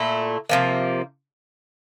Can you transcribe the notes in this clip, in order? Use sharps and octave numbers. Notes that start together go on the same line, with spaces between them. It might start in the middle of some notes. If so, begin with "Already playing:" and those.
Already playing: A#2 A3 E4
C3 F3 A#3